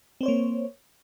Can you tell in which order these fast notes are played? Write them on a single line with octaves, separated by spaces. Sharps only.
C4 C5 C#5 A#3